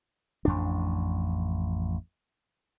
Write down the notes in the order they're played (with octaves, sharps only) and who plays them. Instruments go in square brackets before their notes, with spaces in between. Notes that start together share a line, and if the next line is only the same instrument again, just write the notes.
[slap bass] A1 F2 D4